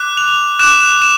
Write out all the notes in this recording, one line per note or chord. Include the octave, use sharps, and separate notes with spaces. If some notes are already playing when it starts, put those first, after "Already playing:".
Already playing: D6 F#6
F7
D6 F#6 E7
E7